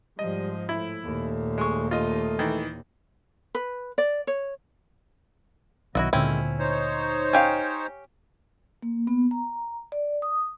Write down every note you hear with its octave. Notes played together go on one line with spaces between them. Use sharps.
G#2 F3 G3 D#5
A2 E4
D#2 A#2 A3
G#3 C#6
A3 F4 D#5
D#3 E3
B4
D5
C#5
B1 D#3 F#3 B3 E4 F#4 A4 D#5
D2 A#2 D3 D#3 G#3 C4 C#4 E4
D#4 C5 C#5
C#4 G4 F5
A#3
B3
A#5
D5
D#6